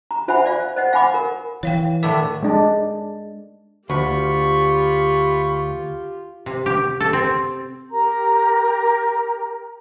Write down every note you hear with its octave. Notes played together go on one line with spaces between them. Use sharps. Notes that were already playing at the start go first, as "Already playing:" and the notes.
A#5
F4 C5 E5 F#5 G#5 B5
C5 D5 F5
C5 D#5 F#5
F5 F#5 G#5 B5 D6
A#4
E3 C#5 F5 G5
A2 D3 D#3 E5 D6
G#3 D4
D2 F4 G4 B5 C#6
C3
G4
A4
C4
G4 A#4 A#5